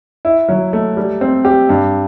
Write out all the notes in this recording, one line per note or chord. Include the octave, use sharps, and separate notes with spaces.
E4
F#3
A3
G3
C4
G4
G2